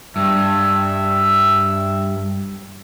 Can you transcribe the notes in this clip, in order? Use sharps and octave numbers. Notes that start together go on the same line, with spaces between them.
G2 E5